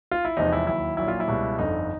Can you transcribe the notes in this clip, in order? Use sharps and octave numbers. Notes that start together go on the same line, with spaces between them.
F4
E4
E2 C3 F3 G#3 D#4
E4
D#2 D#3 F#3 E4
A#1 A#2 F#3 E4
F4
E4
C#2 B2 G3
G1 F2 D3 D#4